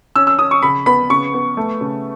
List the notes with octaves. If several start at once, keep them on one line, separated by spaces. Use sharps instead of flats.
C#4 E6
E6
C#4 D#6
C#6
C#3 B5
B3 B5
C#3 C#6
B3
A3
C#3